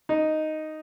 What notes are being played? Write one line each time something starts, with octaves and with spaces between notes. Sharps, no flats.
D#4